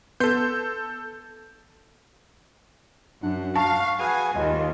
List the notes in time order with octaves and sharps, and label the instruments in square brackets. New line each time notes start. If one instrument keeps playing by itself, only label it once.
[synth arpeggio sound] B3 C6 [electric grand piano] A4 G6
[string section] F#2 [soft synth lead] D4 [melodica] F#5
[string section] F5 [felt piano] A5 [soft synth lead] C#6
[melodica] F#4 G#4 B4 [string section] G#5
[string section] D#2 [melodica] F4 [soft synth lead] D#5